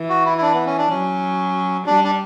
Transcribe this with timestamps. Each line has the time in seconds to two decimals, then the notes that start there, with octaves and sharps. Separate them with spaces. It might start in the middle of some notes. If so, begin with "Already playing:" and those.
Already playing: E3
0.09 F#4
0.26 E4
0.38 E4
0.42 D4
0.54 B3
0.66 C#4
0.78 D4
0.90 F#3 C#4
1.86 G3 D4
2.04 D4